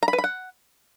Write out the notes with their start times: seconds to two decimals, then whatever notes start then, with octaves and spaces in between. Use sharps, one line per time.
0.03 A#5
0.08 B5
0.13 B4
0.18 B5
0.24 F#5